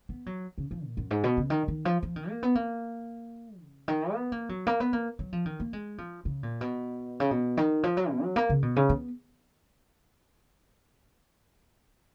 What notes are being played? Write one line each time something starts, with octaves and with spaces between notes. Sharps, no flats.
B3
F#3
C#3
F3
A#2
F#2
G#2
B2
C#3
D#3
D#3
F3
F3
D#3
A#3
B3
A#3
C#3
D#3
B3
A#3
F#3
A#3
B3
A#3
F#3
F3
D#3
A#3
G#3
F3
C#3
A#2
B2
C#3
B2
D#3
F3
F#3
B2
F#3
A#3
C#3
B2
C#3
B3